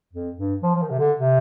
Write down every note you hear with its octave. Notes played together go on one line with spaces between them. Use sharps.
F2
G2
F3
F3
D#3
C3
D3
C3